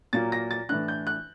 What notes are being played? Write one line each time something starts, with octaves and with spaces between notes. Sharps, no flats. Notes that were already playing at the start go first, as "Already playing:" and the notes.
A#2 F#3 A#3 A6
A#6
A6
A2 E3 A3 D4 F#6
G6
F#6